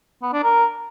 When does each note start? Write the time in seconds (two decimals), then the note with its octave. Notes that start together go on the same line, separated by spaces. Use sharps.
0.22 B3
0.33 D4
0.44 A#4